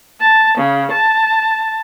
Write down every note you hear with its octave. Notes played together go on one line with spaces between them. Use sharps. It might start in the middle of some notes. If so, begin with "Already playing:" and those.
A5
C#3
A5